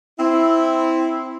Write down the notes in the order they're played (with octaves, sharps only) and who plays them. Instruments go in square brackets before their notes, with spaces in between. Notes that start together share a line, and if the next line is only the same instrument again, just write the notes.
[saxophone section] C4 E4